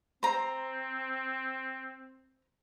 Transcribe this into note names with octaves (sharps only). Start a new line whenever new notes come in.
C4 C5 A#5